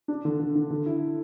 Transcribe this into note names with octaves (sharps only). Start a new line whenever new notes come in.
D4
D3
D3
D3
D3
E4